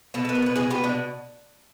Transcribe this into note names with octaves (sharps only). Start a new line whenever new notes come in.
B2 A4
A4
B3
A#4
B2 B4
B2 G#4
B3 G4
B2 D4